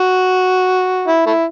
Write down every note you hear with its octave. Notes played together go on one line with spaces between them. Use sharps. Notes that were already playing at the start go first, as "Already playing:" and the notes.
Already playing: F#4
E4
A3 E4